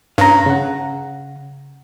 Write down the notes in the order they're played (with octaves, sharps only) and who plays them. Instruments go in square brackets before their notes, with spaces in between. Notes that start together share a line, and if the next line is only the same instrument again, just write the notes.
[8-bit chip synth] G2 [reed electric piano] C#4 [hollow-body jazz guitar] F5 A#5
[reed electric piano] C#3 F#5